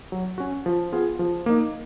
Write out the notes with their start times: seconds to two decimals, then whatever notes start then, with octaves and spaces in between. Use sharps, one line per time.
0.12 F#3
0.38 C#4 F#4
0.66 F3
0.92 B3 F4 G#4
1.19 F3
1.46 A#3 D#4